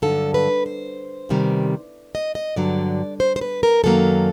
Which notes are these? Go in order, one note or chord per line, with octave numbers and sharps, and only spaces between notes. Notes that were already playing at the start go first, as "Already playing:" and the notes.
G2 D3 F#3 A4
B4
C5
E2 C3 D#3 G3
D#5
D#5
G2 D3 F#3 D5
C5
C5
B4
A#4
F#2 D#3 F#3 A#3 A4